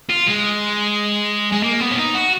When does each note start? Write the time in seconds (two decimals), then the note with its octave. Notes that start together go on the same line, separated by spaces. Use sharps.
0.10 F4
0.28 G#3
1.52 G#3
1.64 A#3
1.80 B3
1.91 C#4
1.97 D#4
2.14 F#4